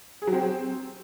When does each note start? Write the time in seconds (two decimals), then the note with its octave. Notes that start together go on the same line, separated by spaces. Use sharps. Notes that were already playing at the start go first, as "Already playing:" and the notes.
0.22 G#4
0.27 F#3
0.33 C4